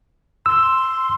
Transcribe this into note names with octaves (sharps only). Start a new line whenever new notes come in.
C6 E6